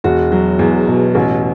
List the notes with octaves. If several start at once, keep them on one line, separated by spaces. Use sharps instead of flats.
E1 F#4
F#3
E2
B2
A1